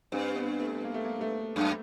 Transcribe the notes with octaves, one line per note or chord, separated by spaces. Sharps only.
G2 C4
B3
A3
A#3
A3
A#3
A3
F#2